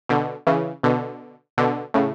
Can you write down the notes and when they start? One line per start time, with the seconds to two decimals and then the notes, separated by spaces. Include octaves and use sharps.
0.09 B2 D3
0.47 C#3 E3
0.83 B2 D3
1.58 B2 D3
1.94 A2 C#3